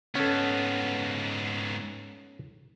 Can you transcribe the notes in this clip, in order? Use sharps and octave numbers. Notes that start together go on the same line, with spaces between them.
G#2 B3 C#4 A4